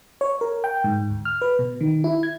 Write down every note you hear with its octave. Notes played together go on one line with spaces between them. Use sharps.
C#5
A#4
G5
G#2
D2
F6
B4
B2
D#3
E4
G#6